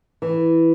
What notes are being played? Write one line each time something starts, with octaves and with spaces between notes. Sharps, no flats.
E3